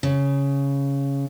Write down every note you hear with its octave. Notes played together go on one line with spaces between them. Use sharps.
C#3